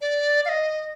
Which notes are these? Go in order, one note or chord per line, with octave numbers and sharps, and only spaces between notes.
D5
F5
D#5